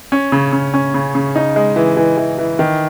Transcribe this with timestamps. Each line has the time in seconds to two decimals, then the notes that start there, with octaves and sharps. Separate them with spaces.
0.12 C#4
0.32 C#3
0.53 C#3
0.74 C#4
0.94 C#3
1.15 C#3
1.36 D#4
1.56 G#3
1.76 E3
1.97 E3
2.17 E3
2.38 E3
2.59 D#3